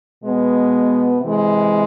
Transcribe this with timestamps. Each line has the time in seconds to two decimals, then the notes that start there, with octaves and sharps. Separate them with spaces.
0.24 B2 G#3 B3
1.21 C3 E3 G#3